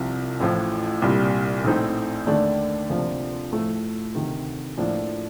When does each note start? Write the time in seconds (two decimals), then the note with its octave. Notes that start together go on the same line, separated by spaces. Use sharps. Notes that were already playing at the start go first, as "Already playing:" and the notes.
Already playing: C2 C3 F3
0.40 A1 A2 F3
1.02 C2 A#2 G3
1.64 A#1 A2 A3 C4 D#4
2.27 D#2 D3 A3 D4
2.90 D2 C3 F3 A#3 D4
3.52 A2 F3 A3
4.15 D2 C3 D#3
4.77 A2 F3 A#3 D4